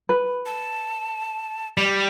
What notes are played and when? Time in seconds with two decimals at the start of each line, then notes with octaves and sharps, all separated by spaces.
0.09 B4
0.46 A5
1.77 G3 D6